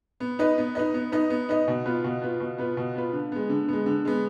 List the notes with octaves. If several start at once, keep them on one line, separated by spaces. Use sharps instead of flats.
B3
D#4 B4 D#5
B3
D#4 B4 D#5
B3
D#4 B4 D#5
B3
D#4 B4 D#5
B2
B3 F4 B4
B2
B3 F4 B4
B2
B3 F4 B4
B2
B3 F4 B4
D3
G#3 B3
D3
G#3 B3
D3
G#3 B3